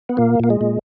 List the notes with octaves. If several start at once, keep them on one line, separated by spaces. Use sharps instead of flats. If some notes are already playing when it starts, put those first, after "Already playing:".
B3
A#2 A#3
A#2 A#3
G#3
A#2